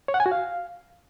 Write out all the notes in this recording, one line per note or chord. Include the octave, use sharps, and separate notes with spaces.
C#5
F#5
G#5
F#4
F5